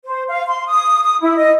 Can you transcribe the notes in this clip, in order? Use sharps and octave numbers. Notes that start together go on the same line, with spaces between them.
C5
F5
C6
D#6
D#6
E4
D#5